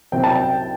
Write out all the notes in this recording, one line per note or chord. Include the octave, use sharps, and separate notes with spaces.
C2 C3 F#3 C4 G5
A5
G5